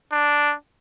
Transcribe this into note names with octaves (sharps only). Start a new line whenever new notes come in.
D4